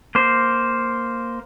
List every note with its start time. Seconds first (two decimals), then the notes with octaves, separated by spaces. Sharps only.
0.15 A#3 C5